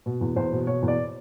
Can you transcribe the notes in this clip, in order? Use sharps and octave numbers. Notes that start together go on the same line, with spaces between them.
B2
E2
E2 C5
B2
B2 C#5
E2
D5